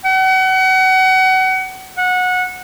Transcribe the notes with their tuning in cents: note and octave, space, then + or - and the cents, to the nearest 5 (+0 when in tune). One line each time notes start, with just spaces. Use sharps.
F#5 +30
F#5 -20